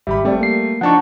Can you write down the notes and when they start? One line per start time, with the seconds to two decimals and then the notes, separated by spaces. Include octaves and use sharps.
0.07 G#1 G3 G4 E5 B5
0.24 G3 A3 C4 G4 D5
0.39 A#3 C7
0.81 F3 D4 D#4 F#5 A5 C#6